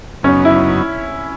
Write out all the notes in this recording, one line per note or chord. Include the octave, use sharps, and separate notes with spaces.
F#2 C#3 F#3 B3 C#4 D#4
E4